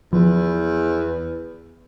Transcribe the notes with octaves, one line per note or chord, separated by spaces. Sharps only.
E2 F3